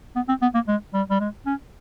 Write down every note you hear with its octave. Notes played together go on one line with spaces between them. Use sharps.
B3
C4
B3
A#3
G#3
G3
G3
G#3
C#4